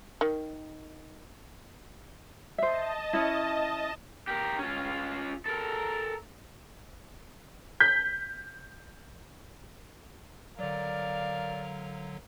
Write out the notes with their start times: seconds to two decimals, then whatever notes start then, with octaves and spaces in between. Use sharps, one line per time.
0.21 D#3
2.58 C5 D#5 E5 A5
3.13 C#4 E4
4.27 G4 A#4
4.58 C#4 F4
5.45 A4 A#4
7.80 G6 B6
10.59 D3 F#3 A#4 D5 F5